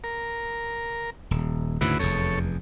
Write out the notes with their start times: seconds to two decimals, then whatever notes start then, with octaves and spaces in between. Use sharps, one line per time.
0.04 A#4
1.31 D#1
1.81 D2 G#2 C#3 E4 F#4 B4
1.99 F1 E2 A4 C#5